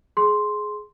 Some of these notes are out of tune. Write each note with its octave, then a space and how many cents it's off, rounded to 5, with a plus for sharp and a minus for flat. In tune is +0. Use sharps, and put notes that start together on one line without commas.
G#4 +15 C6 +0